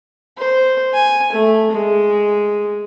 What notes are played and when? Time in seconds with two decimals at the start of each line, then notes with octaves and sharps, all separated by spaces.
0.38 C5
0.94 G#5
1.32 A3
1.71 G#3